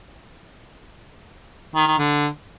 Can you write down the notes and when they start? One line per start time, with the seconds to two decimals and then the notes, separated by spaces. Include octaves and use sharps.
1.75 D#3
1.87 D#3
1.98 D3